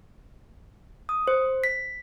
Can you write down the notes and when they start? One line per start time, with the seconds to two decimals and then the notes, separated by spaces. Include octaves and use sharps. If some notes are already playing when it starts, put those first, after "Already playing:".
1.09 D#6
1.28 C5
1.64 B6